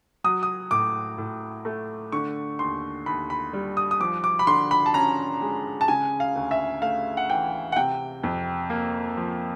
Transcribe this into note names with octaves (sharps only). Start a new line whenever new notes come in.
F#3 D#6
D#6
A2 D6
A2
A3
D3 C#6
D#2 C6
D#2 B5
B5
G3
D#6
D#6
F3 D6
D6
B5
D3 C6
B5
A5
C#4 A#5
G#3
A5
C#3 G#5
F5
D2
E5
A3 F5
F#5
E3 G5
F#5
C3 G5
F2
A#3
F3